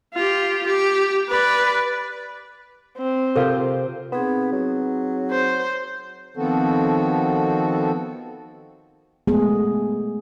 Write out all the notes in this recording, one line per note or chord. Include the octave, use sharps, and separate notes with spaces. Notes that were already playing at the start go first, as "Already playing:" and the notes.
F4 G4
G4
B4 D5
C4
C3 F4 G4 A4 A#4 F5
B3 C4 D#4 G#4
F#3
C5
D#3 F3 B3 C4 F#4 A4
G#3 A3 B3 G#4